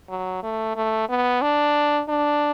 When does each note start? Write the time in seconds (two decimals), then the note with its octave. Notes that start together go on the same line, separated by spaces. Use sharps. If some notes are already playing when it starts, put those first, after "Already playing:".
0.09 F#3
0.43 A3
0.76 A3
1.09 B3
1.42 D4
2.08 D4